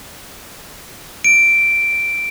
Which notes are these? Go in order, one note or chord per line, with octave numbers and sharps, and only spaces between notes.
D7